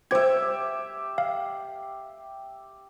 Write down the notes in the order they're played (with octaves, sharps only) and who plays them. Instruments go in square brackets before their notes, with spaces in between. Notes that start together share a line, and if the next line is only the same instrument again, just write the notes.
[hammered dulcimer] G4 E5 [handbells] C5 G#6
[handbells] F5